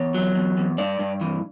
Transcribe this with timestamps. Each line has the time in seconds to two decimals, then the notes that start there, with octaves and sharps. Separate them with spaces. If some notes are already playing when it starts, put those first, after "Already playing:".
Already playing: E2 C#5
0.15 F#3
0.35 E2
0.57 E2
0.78 G2 D5
0.99 G2
1.21 E3